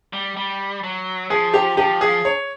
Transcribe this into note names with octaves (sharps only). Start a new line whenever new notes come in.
G3
G3
F#3
F3 G#4
G4
F3 G4
G#4
C#5